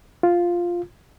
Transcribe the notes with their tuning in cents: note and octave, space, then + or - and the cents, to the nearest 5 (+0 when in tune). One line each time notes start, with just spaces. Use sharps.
F4 +0